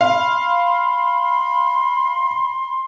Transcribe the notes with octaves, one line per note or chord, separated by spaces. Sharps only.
F5 B5 C6